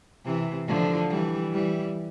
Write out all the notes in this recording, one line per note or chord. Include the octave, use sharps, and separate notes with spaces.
C3 E3
D3 F3
E3 G3
E3 G3